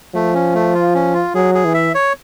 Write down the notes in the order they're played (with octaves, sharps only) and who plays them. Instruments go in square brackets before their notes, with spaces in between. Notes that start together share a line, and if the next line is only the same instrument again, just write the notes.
[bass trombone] F3 [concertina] A3
[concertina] C#4
A3
F4
C#4
F4
[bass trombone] F#3 [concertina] G#4
[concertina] G#4
[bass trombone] E3
[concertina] E5
C#5